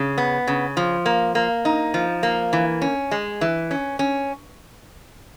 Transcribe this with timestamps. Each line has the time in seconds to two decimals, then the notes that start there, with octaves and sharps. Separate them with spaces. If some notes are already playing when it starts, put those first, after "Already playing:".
Already playing: C#3
0.18 B3
0.48 C#3
0.77 F3
1.06 A#3
1.35 A#3
1.65 D#4
1.94 F3
2.23 A#3
2.53 E3
2.82 C#4
3.11 G#3
3.41 E3
3.71 C#4
3.99 C#4